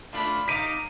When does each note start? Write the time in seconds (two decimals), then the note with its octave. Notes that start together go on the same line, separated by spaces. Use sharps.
0.12 A3 D4 F4 B5
0.48 D#4 F5 A#5 D6 B6 D#7